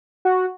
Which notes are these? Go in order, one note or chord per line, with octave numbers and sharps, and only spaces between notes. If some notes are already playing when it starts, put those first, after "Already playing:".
F#4